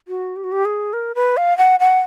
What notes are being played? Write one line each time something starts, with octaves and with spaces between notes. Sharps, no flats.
F#4
G4
F#4
G4
G#4
A#4
B4
F5
F#5
F#5